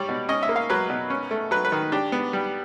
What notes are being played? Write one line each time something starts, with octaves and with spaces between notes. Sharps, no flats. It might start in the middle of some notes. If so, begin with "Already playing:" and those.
Already playing: G3 C#5 D5
B2
C#4 D#5
E5
A#3
F5
F#3 B4
B2
C#4
A3
F#3 B4
B4
D#3
D4 G4
B3
G3